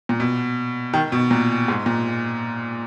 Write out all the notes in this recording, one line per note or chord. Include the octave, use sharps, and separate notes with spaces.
A#2
B2
D#3
B2
A#2
G#2
A#2